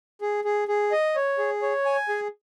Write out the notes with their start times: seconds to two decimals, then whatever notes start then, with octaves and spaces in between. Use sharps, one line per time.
0.21 G#4
0.44 G#4
0.68 G#4
0.91 D#5
1.16 C#5
1.38 G#4
1.62 C#5
1.85 G#5
2.09 G#4